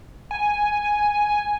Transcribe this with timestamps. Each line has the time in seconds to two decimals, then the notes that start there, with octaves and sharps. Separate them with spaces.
0.31 G#5